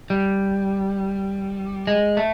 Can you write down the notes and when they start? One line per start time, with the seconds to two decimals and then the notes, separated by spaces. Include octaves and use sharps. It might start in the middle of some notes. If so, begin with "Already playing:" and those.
0.10 G3
1.87 G#3
2.17 A3